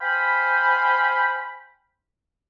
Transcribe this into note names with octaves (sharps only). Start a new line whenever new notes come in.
C5 F5 G5 G#5 B5